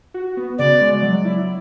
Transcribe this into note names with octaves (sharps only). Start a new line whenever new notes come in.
F#4
B3
C#3 D5
G#3
F#3
E4